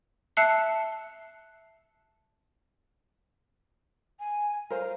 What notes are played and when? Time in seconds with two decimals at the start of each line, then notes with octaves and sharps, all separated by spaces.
0.37 E5 A5 E6 F#6 C7 C#7
4.20 G#5
4.70 A#4 C5 F5